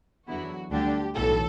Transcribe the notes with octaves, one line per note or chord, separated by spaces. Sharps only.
E2 D3 F#3 B3 E4 F#4
D2 D3 G3 D4 G4
B1 A2 E3 A4